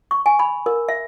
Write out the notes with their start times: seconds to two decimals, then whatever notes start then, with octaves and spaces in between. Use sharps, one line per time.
0.11 C#6
0.26 G#5
0.39 B5
0.66 A#4
0.89 E5